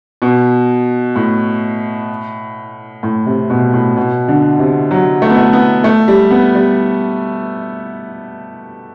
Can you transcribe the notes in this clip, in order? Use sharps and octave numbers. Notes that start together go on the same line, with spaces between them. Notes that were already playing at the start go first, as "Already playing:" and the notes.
B2
A2
A2
C3
B2
A2
B2
D3
C3
F#3
A3
B3
A3
B3
A3
G3
B3
G3